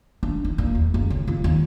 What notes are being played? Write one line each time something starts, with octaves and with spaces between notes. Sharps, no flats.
D4
D#4
A#2
E2
F#1
C#3
F4
D#2